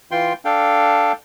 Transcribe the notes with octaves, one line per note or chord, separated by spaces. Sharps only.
E3 F4 G5 C6
D4 A4 F5 G5